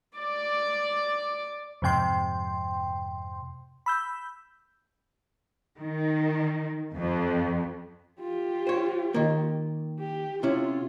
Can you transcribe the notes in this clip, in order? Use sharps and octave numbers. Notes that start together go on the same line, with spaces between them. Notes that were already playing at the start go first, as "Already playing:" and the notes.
D5 D6
F2 G#2 C3 G5 C6
B5 E6 G6
D#3
F2
F4 G4
C5 C#5
D#3 A#3
G4
C3 C#4 E4 F4